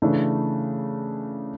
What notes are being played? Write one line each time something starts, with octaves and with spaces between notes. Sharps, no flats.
C#3 E3 A3 D4